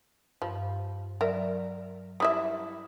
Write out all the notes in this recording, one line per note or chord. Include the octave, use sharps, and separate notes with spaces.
G2 F3
F#3 A#4 D5 E5
G3 E4 E5 D#6